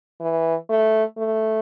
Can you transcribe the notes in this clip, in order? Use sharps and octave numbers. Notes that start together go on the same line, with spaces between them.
E3
A3
A3